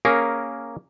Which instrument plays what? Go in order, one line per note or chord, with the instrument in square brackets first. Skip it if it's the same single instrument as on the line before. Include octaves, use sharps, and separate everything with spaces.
[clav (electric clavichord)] A#3 C#4 G#4 A#4